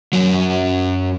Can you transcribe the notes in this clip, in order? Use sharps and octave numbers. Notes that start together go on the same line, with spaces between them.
F#2 F#3